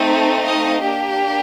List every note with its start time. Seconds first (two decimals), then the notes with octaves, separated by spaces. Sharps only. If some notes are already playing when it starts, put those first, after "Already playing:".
Already playing: A3 C4 D#4
0.43 D#5 F5
0.81 A#3 D4 G4